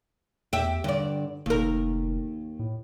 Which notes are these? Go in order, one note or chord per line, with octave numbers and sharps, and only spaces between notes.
E2 G4 E5
G2 D3 D5
F1 D#2 A#4
A2